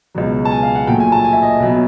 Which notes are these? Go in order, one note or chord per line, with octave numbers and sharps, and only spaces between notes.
C#2 B2 F#3
A5
G#5
F5
F#5
A#1 A#2 F#3 A3 G5
G#5
A5
G#5
E5
D#5
B1 B2 F#3